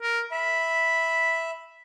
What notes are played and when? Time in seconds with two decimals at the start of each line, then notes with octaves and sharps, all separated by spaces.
0.02 A#4
0.31 E5 B5